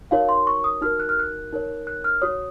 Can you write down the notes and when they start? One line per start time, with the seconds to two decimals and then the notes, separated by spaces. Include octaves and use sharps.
0.11 D#4 F#4 A#4 C#5 F5
0.29 C6
0.47 C#6
0.64 D#6
0.82 D#4 F#4 A#4 F6
1.00 F#6
1.09 F6
1.19 F#6
1.53 D#4 A#4 C#5
1.87 F#6
2.04 F6
2.22 F#4 C#5 D#6